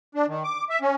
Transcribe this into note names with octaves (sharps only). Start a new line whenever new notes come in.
D4
D#3
D6
E5
C#4